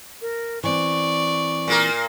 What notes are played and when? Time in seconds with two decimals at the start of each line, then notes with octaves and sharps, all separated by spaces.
0.21 A#4
0.64 E3 C4 D5 C#6
1.68 A#2 A#3 A#4